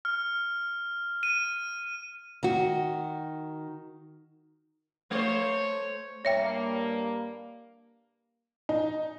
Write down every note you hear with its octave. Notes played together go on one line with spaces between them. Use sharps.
F6
D#7
D#3 F#4
A3 C5 C#5
G2 G3 A#3 C#5 E5 G5
D#4